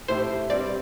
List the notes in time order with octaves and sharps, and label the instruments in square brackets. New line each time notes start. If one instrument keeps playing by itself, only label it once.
[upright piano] A2 A3 E4 G4 [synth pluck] C5
[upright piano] G2 G3 C4 [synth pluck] D5